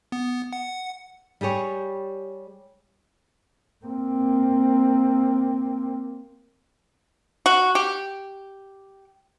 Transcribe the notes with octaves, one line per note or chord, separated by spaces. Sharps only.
B3
F#5
G3 G4 G#4 C#5
A#3 C4
F#4
G4